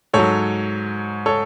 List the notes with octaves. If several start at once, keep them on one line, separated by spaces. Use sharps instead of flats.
G#2 F#3 A4 C#5
A4 C#5